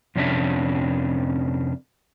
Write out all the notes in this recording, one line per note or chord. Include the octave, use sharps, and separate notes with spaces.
F2 C3 C#4 D4 E5